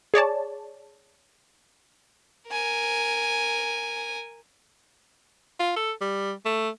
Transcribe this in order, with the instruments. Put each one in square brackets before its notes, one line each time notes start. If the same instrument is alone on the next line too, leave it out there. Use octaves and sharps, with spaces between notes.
[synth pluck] G#4 C#5 D5 A5
[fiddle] A#4 G#5
[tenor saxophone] F4
A4
G3
A3